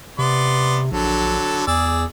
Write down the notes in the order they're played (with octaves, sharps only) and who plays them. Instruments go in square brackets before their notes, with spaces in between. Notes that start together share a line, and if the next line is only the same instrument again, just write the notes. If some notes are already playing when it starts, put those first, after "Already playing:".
[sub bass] C3 [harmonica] B3 D5 C6
[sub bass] A#1 [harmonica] D3 F#3 A4
[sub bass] E2 [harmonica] G#4 D5 E6